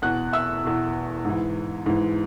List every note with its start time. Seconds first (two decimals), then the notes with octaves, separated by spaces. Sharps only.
0.02 E2 B2 F#5 F#6
0.33 E5 E6
0.63 E2 B2
1.25 G#2 E3
1.86 G#2 E3